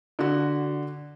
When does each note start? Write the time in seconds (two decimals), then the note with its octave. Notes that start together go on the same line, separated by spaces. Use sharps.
0.19 D3 F#4